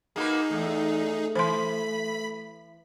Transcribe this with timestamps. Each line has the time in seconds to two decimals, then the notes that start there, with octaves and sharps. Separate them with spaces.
0.16 A#3 D#4 F#4 G#4 B4
0.51 E2 A3
1.35 E3 C5 B5 C6 B6